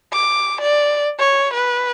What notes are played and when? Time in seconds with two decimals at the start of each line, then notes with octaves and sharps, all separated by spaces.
0.13 D6
0.61 D5
1.19 C#5
1.54 B4